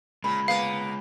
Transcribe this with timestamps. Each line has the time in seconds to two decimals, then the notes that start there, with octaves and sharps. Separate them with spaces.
0.24 A#2 G#3 F4 G#4 B5
0.48 A#3 B3 F5